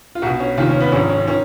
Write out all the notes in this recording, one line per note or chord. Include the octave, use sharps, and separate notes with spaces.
F4
B1 B2 F#4
C#4
F1 D#2 D#3 F4
C#4
B3
G#1 G#2 F3 C#4
C#4
D#3 C#4